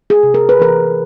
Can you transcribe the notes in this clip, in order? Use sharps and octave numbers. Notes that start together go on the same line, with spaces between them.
G#4
C3
A#4
B4
E3 A#4